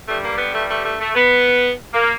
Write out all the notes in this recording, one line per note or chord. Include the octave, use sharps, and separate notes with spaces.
G2 D3 G3 A3
A#3
B3
A3
A3
A3
A3
B3
A#3